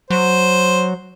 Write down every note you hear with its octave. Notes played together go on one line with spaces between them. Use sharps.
F#3 C5